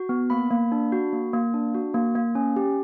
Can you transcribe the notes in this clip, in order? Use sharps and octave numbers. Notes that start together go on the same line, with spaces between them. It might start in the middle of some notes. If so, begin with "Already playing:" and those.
Already playing: F#4
B3
A#3 B5
A#3
D4
F#4
A#3
A#3
D4
F#4
A#3
A#3
C#4
G4